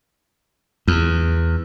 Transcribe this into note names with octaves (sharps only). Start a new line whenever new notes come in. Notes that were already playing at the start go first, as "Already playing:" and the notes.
E2